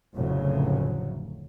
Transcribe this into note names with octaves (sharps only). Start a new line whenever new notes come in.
F1 D2 A2 C#3 F#3